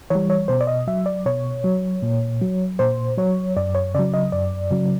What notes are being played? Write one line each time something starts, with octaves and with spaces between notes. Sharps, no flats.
E3 G3 C#5
C#5
B2 C5
D5
D#5
F#3 E5
D5
B2 C#5
F#3
A#2
F#3
A#2 C5
F#3 C#5
F#2 D5
C#5
C#3 F#3 D5
D#5
F#2 D5
C#3 F#3